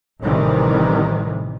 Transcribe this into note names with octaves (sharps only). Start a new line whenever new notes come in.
A1 C3 D#3 E3 G3